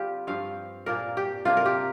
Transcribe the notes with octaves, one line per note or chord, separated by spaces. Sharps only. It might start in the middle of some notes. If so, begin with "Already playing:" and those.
Already playing: D3 G3 C4 F4 G4
G2 F3 C4 F5
A#2 A#3 D4 A#4
G4
C3 A#3 D4 F4
A#4
G4